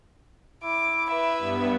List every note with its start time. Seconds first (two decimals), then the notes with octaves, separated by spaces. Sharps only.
0.64 E4 D6
1.10 B4 E5
1.39 G2 B3